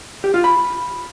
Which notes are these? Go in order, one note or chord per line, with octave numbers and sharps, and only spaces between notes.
G4
F4
B5